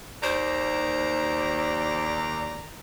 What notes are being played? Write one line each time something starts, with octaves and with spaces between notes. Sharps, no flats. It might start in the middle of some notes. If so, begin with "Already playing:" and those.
D#2 C5 D5 A#5